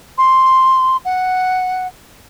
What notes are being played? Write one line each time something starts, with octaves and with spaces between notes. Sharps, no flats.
C6
F#5